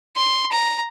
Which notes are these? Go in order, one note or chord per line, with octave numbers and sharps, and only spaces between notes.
C6
A#5